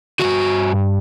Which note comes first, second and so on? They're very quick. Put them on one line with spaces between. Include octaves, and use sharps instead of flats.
D#3 F#4 G2